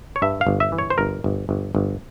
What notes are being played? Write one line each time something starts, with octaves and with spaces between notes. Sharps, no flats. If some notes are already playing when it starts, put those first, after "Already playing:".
C#5
G2 E5
F5
G1
E5
E3
C#5
C5
G1 A#4
G1
G1
G1